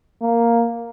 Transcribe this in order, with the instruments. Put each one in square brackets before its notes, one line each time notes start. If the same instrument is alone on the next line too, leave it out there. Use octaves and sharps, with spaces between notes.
[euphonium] A#3